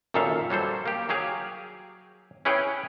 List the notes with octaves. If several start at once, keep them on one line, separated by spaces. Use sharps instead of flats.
F#2 A#2 D#3 A4 E5 F5
F#3 G3 A4 C5
A#3 G4
F#3 G4 G#4 F5
C#4 E4 G#4 B4 C#5 G5